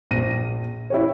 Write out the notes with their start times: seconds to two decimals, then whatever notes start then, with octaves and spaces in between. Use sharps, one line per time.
0.11 A#1 A#6 D#7
0.90 E4 G4 C#5